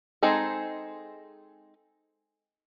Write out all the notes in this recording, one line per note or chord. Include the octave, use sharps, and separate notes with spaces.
G#3 C4 D#4 G#4 A4